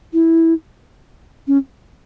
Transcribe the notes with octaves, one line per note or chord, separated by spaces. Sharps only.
E4
C#4